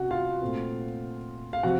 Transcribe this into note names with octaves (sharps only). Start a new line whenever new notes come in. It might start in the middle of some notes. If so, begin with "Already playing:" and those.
Already playing: C3 C#4 F#4 F#5
F4 F5
A#2 A3 C4
F5
C3 F3 C4 F#4 F#5